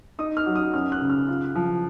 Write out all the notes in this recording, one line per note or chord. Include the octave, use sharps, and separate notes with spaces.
D#4 D#6
F6
F#3
D#6
F#2 F6
F#6
C#3
F6
F4
F3